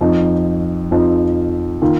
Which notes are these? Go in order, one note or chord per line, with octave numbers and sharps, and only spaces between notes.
F2 F3 D#4
F2 F3 D#4
D#3 A#3 F4